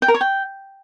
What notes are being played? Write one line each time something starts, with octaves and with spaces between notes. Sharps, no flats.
G5
A#4
C#5
G5